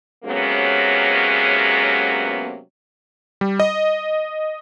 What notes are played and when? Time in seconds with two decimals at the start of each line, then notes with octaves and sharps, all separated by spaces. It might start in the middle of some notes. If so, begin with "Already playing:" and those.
0.25 C3 F#3 G#3 A#3 B3 C#4
3.41 G3
3.60 D#5